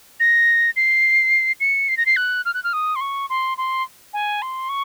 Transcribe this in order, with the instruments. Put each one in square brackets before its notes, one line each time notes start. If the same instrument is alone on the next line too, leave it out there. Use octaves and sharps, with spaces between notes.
[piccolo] A#6
C7
C#7
C7
A#6
C7
F#6
F6
F#6
F6
D#6
C6
C#6
C6
C6
G#5
C6
C#6